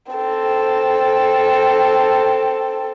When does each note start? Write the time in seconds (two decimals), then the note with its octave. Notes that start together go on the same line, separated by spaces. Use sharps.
0.12 C4 A4